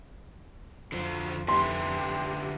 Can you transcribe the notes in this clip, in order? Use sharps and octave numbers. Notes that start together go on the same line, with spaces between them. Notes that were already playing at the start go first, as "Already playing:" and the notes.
F2 D3 F4 C5
D3 G4 B4 E5 C6